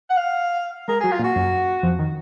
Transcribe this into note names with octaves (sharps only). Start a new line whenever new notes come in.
F#5
F5
G#3 G#4 A#4
G#4
F#3 F#4
F4
A#2 A#3
F#4
F#2 F#3
F2 F3
D#3